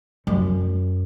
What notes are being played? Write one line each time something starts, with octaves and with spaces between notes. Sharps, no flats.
F#2